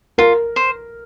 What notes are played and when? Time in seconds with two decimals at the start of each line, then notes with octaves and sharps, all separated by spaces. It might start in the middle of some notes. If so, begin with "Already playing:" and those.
0.18 F4 A#4
0.56 C5